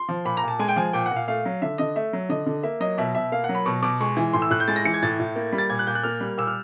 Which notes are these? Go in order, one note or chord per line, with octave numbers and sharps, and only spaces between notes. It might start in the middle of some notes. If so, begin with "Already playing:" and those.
Already playing: C6
F3
A#2 B5
A#5
A#2 A5
G#3 G#5
G5
F3 G#5
A#2 G5
F#5
A#2 F5
A3 F5
F#3
D3 E5
D3 D#5
A3 E5
F#3
D3 D#5
D3
A#3 E5
F#3 D#5
B2 E5
B2 E5
A#3 F5
F#5
F#3
B5
B2 C#6
B2 D6
G#3 C#6
E3
A2 C6
E6
A2 F#6
G6
G#3 A6
A#6
E3 C#7
G#6
A2 A6
A2
A#3
G3
A6
A#2 G#6
F#6
A#2 G6
F#6
A#3 F6
G3
A#2 E6
F6